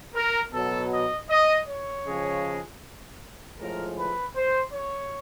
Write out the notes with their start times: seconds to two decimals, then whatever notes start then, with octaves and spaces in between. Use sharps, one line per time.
0.14 A#4
0.51 B2 F#3 A4
0.90 D#5
1.29 D#5
1.67 C#5
2.04 C#3 F3 G#3
3.57 A2 F3 G#3 A#4
3.96 B4
4.35 C5
4.72 C#5